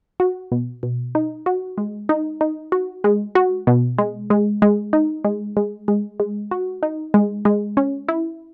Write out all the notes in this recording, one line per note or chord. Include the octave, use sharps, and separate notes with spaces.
F#4
B2
B2
D#4
F#4
G#3
D#4
D#4
F#4
G#3
F#4
B2
G#3
G#3
G#3
D#4
G#3
G#3
G#3
G#3
F#4
D#4
G#3
G#3
C#4
E4